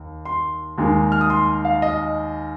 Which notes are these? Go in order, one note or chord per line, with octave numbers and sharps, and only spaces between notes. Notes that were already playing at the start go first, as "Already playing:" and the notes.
Already playing: D#2
C6
D#2 D#3 G#3 D#4
F6
D#6
C6
F5
D#5